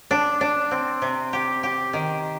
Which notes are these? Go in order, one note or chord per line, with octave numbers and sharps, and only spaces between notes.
D4
D4
C4
C3
G4
G4
D#3